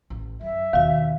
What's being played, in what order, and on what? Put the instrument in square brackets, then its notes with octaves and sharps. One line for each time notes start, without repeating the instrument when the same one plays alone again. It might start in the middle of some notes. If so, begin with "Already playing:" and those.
[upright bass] A1
[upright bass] F#2 [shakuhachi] E5
[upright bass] D#2 B2 [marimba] D#3 F#4 [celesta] F5